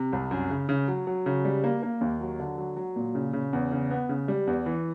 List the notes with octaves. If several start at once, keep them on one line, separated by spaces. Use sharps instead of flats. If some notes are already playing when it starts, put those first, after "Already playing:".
Already playing: C3
C2
F#2
C#3
C#3
F#3
F#3
C#3
G3
A#3
A#3
D#2
F#3
D3
F#3
F#3
A#2
C#3
C#3
E2
C#3
B3
C#3
G3
E2
E3